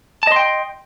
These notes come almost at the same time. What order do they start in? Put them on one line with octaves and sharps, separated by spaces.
A5 D#5 C6 G5